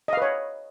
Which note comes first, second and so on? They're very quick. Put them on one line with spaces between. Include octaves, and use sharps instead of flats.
D#5 F5 B4 C#5